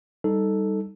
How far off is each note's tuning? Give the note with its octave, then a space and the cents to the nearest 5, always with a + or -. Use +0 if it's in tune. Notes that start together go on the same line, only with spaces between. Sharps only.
G3 +0 D#4 +0 A4 +0